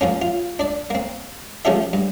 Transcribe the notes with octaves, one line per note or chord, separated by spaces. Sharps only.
F3 A#3 C#4
F4
D4 D5
A#3 C4
F3 A3 C#4 G4 G#4 E5
G2